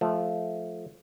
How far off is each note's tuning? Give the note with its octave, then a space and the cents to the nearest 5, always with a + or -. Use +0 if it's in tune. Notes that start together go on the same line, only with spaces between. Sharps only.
F3 +0 A3 -20